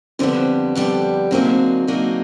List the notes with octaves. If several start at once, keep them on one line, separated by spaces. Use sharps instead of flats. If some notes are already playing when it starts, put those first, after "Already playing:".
F2 D3 G3 B3 C4
F2 D3 G3 B3
D3 F#3 A#3 C4 D#4 G#4
D3 F#3 A#3 D#4 G#4